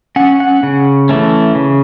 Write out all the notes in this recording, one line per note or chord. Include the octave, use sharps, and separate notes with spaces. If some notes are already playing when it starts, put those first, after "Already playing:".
C#4 F#5
F#5
C#3
E3 A3 C#4
C#3